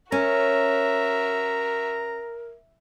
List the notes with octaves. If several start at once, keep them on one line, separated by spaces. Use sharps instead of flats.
C#4 F#4 A#4 E5 A#5